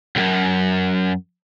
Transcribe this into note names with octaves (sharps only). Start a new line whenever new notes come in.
C#2 F#2